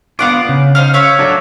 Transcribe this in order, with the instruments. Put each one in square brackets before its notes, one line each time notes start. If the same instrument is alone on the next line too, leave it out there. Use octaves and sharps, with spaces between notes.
[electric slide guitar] B3 D4 F4 [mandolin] F5 F#5 D6
[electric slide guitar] C#3
[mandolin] D#4 C5 F5
C#5 E5 F5
[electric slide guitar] F#3 D4 A4